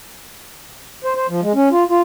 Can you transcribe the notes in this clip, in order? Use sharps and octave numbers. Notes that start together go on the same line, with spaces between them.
C5
C5
F3
G#3
C#4
F4
F4